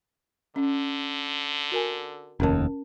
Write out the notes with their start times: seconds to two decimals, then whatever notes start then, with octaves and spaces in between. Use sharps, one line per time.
0.56 D3 C#4
1.72 F#4 A#4 G#5
2.40 F1 D#2 C#4 A#4 A5